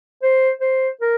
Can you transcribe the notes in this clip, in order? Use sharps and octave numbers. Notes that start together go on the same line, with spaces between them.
C5
C5
A#4